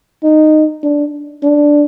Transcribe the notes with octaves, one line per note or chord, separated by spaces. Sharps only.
D#4
D4
D4